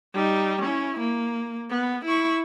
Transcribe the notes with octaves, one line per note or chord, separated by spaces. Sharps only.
G3 D#4
C#4 E4
A#3
B3
E4 C#6